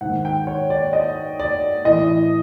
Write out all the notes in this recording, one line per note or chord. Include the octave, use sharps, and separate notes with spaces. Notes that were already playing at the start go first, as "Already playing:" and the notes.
G#2 D#3 F#5
G5
C#5
D5
D#5
D5
A2 E3 D#5